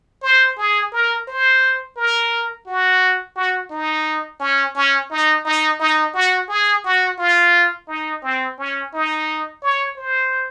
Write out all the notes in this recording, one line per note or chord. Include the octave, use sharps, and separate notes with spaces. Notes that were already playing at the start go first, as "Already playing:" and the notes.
C5
G#4
A#4
C5
A#4
F#4
F#4
D#4
C#4
C#4
D#4
D#4
D#4
F#4
G#4
F#4
F4
D#4
C4
C#4
D#4
C#5
C5